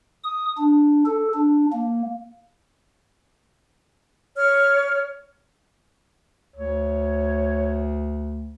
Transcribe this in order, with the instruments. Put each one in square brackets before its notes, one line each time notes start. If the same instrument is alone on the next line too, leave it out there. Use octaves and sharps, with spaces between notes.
[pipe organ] D#6
D4
A4
D4
A#3
[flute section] C#5 F6
[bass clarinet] D2 [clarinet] C#5